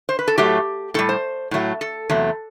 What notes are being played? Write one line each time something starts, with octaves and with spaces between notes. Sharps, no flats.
C5
B4
A4
A2 F#3 A3 G4
A2 G3 A4
C5
A2 F#3 A3
A4
E2 C3 F#3 A3